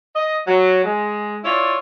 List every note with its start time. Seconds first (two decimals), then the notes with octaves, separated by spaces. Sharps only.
0.15 D#5
0.47 F#3
0.84 G#3
1.44 E4 F4 C#5 D5